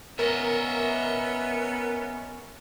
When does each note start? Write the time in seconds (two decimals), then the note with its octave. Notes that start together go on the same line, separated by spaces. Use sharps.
0.19 B3 C#4 A#4 D#5 E5